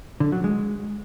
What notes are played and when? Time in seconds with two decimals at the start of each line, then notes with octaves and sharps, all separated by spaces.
0.20 D3
0.32 F#3
0.44 G#3